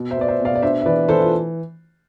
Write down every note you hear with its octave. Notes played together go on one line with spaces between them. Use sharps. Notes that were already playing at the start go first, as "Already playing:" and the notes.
Already playing: B2
C5 E5
B3 D5
C5 E5
B2
D5 F5
D5
D4 C5 E5
E5
E3 B4 D5
E3 A4 C5
F4